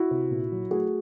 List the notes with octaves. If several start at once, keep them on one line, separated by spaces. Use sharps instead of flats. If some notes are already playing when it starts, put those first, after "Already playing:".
Already playing: E4 F#4
C3
A#2
F#3
A3 F#4 G#4